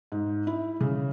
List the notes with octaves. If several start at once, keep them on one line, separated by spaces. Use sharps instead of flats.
G#2
E4
C#3